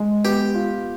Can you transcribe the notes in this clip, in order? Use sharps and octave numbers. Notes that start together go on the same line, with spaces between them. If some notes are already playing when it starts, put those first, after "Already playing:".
Already playing: G#3 G#4
B3 G4
F4